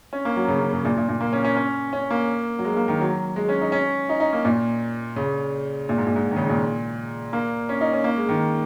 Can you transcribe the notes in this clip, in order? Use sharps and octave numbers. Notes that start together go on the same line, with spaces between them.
C#4
A#3
F#3
C#3
C#3
C#3
A#2
A#2
A#2
A#3
C#4
C#4
C#4
C#4
A#3
F#3
G#3
A#3
D#3
F#3
G#3
C#4
D#4
C#4
D#4
D#4
A#3
A#2
C#3
A#2
G#2
A#2
G#2
D#3
C#3
A#2
A#3
C#4
D#4
C#4
A#3
G#3
D#3